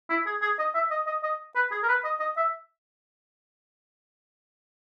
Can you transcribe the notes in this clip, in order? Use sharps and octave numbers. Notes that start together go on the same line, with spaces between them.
E4
G#4
G#4
D#5
E5
D#5
D#5
D#5
B4
G#4
A#4
B4
D#5
D#5
E5